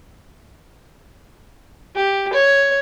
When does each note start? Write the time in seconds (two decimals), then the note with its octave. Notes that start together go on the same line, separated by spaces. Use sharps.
1.96 G4
2.33 C#5